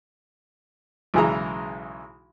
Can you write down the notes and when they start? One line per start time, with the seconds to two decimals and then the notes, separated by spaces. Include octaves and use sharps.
1.14 B1 C#3 E3 G#3 A#5